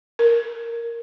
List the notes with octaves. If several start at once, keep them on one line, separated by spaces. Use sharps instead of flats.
A#4